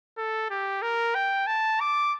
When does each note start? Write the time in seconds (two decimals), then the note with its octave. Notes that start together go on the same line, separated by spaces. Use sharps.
0.18 A4
0.50 G4
0.82 A#4
1.15 G5
1.47 A5
1.81 D6